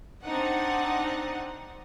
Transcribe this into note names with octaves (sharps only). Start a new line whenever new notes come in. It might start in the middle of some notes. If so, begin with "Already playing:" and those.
C4 D4 D#4 F#5